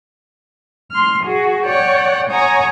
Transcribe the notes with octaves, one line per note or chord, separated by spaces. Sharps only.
C6 F6
F#4 G#4
C#5 D5 F#5 G5
C#5 F#5 G#5 A#5 D#6